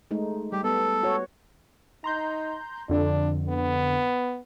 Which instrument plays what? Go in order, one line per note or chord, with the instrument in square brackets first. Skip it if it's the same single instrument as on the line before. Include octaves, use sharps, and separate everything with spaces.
[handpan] G#3 A3 D#4
[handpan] G3 [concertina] G4
[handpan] B3 [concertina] A4
[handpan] F#4 C#5
[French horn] D#4 [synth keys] A#5 C6 G6
[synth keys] F2 D3 [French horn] D4
[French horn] B3